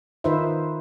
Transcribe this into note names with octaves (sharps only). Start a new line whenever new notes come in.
D#3 D#4 F4 B4 C5 E5